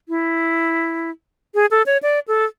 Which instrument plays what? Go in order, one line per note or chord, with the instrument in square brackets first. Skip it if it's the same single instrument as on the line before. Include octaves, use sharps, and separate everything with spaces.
[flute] E4
G#4
A4
C#5
D5
A4